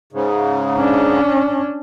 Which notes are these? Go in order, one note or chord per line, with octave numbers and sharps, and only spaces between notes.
G#2 C#3
C#4 D4